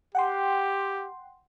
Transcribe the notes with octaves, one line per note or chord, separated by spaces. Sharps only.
G4 F#5 G5 C6